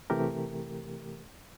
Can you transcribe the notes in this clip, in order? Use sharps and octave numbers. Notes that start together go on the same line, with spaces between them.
C3 E3 A3 G4 A#4